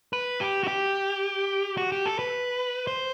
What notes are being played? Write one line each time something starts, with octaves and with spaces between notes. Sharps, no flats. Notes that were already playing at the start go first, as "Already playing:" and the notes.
B4
G4
F#4
G4
F#4
G4
A4
B4
C5